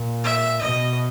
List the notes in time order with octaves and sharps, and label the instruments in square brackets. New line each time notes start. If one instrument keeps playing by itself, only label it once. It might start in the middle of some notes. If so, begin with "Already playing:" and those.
Already playing: [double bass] A#2
[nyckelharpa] E5
[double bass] B2 [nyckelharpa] D#5